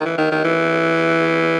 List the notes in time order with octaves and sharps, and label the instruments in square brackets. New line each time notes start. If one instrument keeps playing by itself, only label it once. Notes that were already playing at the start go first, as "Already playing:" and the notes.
[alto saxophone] D#3
E3
D#3
D#3
E3